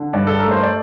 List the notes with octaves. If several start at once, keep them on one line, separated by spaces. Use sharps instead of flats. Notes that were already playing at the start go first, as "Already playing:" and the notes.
Already playing: D3
G2 D5
A4
A#4
A3
C5
D5